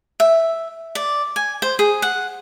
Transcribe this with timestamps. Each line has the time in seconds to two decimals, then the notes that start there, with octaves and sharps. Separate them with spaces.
0.20 E5
0.95 D5
1.36 G#5
1.62 C5
1.79 G#4
2.02 F#5